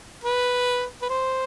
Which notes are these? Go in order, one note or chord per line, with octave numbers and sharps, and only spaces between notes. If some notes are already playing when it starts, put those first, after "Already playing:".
B4
B4
C5